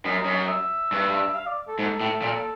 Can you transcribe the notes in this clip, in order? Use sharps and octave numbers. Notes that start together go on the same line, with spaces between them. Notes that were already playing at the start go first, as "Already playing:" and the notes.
F#2 D#5
F#2
E5
G2
F5
D5
A4
G#2 A4
A2
A#2